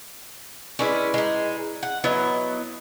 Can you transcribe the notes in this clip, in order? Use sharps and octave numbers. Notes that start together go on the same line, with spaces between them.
G#3 C#4 E4 B4 D5
G#3 D#4
F#5
F#3 B3 E4 C#5 D#5